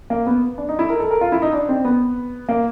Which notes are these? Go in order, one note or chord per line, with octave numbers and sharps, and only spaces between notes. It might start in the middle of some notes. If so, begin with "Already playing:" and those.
A#3
B3
D4
D#4
E4
A#4
A4
A#4
F4
E4
D#4
D4
C4
B3
A#3